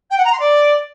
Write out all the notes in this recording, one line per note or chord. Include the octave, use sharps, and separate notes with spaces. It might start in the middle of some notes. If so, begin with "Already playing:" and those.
G5
F#5
A#5
C6
D5